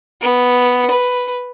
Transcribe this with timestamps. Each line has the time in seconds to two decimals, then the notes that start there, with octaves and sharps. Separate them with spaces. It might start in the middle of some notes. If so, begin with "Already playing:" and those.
0.22 B3
0.91 B4